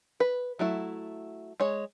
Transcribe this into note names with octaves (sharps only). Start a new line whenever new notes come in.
B4
F#3 A3 E4
G#3 C#5